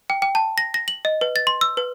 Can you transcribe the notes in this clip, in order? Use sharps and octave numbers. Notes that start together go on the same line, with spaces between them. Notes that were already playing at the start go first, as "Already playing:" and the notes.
G5
G5
A5
A#6
A#6
F#7
D#5
B4
A6
C6
E6
B4